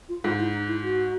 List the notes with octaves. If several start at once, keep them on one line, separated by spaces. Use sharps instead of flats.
F4
G#2 F4
E4
D#4
E4
F#4